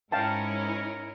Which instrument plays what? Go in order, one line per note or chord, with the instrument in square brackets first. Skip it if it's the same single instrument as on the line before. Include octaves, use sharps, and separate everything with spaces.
[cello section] G#2 A#4 C#5 [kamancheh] C#4 E4 [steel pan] F5 G5 A5